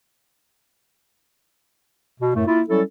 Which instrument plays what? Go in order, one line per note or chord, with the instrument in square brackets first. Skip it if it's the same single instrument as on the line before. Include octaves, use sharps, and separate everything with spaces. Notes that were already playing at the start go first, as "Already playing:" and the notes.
[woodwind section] B2
F#2 A2 A3
A#3 E4 F4
F#3 G3 C#4 E4 A4